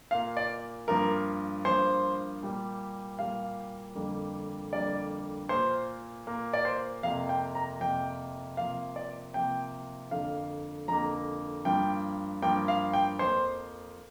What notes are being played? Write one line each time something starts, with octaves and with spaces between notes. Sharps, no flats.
A#2 A#3 F5
D5
G2 F3 A#3 A#4
G2 F3 A#3 C5
A#2 G3 A#3
A#2 G3 A#3 F5
F2 D3 G3 A#3
F2 D3 G3 A#3 D5
A#2 A#3 C5
A#2 A#3
D5
C5
F2 C3 A#3 F5
G5
A#5
F2 C3 A#3 G5
C3 F3 A#3 F5
D5
C3 F3 A#3 G5
F2 D3 A#3 F5
F2 D3 A#3 A#5
G2 F3 A#3 G5
G2 F3 A#3 G5
F5
G5
F2 F3 A#3 C5